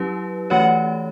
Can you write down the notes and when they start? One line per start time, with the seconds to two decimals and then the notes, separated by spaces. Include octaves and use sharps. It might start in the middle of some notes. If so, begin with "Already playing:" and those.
Already playing: F#3 C#4 E4 G4 B4
0.50 E3 A3 C#4 F#4 C#5 F#5